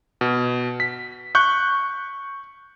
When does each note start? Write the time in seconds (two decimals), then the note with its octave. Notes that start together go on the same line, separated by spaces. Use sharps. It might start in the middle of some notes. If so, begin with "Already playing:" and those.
0.21 B2
0.80 B6
1.35 C#6 F#6 G6